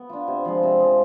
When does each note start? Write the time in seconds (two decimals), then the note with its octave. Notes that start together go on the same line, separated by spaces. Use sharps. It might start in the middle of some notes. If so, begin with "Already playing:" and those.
Already playing: B3
0.10 D4 F4
0.28 C3
0.45 F3 G#3
0.63 C3
0.79 F3 G#3